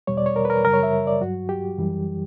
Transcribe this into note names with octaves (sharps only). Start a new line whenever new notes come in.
E2 B2 G3 C#5
D5
C#5
A#4
B4
A#4
F#2 C#3 G3 A#4
C#5
E5
D5
G2 F#3 F#4
G4
F#2 E3 G3